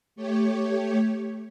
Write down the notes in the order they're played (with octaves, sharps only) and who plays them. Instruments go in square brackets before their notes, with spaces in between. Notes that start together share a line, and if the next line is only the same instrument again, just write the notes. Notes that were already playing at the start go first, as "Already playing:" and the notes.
[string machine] A3 G4 C#5